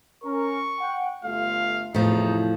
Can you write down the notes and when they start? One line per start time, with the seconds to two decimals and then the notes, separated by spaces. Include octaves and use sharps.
0.24 C#4 A#4 C#6
0.79 F#5 G5
1.24 G1 A3 F4 F5
1.94 E2 A2 C3 F3 D#4